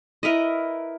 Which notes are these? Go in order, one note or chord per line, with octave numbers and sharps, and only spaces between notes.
E4 A#4 B4 D#5